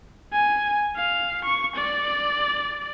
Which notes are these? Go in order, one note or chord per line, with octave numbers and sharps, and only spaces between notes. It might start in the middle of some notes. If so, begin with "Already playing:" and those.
G#5
F5
C#6
D5